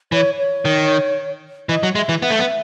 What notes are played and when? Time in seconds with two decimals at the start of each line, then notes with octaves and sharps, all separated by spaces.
0.12 E3 C#5
0.38 C#5
0.65 D#3
1.69 E3 D#5
1.83 F#3
1.95 G#3 E5
2.09 E3
2.22 B3 E5
2.30 A3
2.39 B3